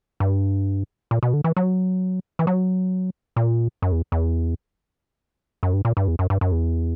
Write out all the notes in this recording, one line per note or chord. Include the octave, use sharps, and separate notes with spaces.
G2
A#2
B2
D3
E3
F#3
E3
F#3
A#2
F#2
E2
E2
F#2
G2
A#2
G2
E2
F#2
G2
F#2
E2